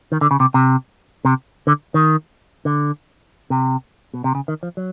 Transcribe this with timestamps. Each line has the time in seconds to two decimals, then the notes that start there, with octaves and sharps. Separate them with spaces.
0.12 D#3
0.21 D3
0.31 C#3
0.40 C3
0.54 C3
1.25 C3
1.67 D3
1.94 D#3
2.65 D3
3.50 C3
4.14 B2
4.24 C3
4.35 C#3
4.48 D#3
4.63 F3
4.77 F#3